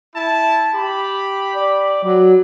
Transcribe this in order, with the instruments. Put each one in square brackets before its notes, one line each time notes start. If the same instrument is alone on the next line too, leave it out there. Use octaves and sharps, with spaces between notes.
[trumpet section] E4 A5
G4 B5
[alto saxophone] D5
F#3